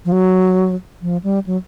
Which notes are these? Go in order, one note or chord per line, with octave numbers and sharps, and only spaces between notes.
F3
F#3
F3
G3
F#3